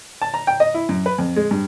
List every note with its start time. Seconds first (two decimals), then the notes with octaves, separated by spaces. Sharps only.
0.22 A5
0.34 A#5
0.47 G5
0.60 D#5
0.74 E4
0.89 F#2
1.06 B4
1.18 F2
1.36 G#3
1.51 G2